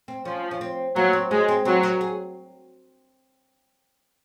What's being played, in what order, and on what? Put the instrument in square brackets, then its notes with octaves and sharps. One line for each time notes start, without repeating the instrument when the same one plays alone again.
[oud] C4
[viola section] F3 [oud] C#4
[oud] C#4
C4
[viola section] F#3 [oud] A#3
[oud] C4
[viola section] G#3 [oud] C#4
[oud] C4
[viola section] F#3 [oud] C4
[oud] A#4
G#4